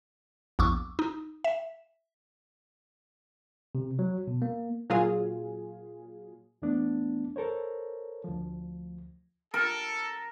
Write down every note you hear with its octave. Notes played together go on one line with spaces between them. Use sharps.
A#1 E2 C#6 D6 E6
D#4
E5
C3
F#3
B2
A#3
A#2 F#3 F4 G#4
E2 E3 A3 B3 D4
A4 A#4 C5 C#5
D2 F3
A4 A#4